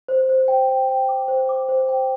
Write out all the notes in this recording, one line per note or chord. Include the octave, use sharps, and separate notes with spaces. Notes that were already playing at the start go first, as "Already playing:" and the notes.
C5
C5
G5
G5
G5
D6
C5
D6
C5
G5